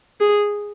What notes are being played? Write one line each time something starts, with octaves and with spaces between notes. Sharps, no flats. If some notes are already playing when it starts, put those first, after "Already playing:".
G#4